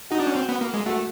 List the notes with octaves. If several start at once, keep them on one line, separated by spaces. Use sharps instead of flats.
D#4 F#4
D4
C#4
C4
B3
A#3
G#3
A3 F#4